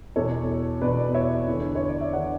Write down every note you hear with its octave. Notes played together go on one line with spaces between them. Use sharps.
E2 B2 A4 C#5
E2 B2 B4 D5
C#5 E5
E2 D3
C#5
D5
E5
D3 D5 F#5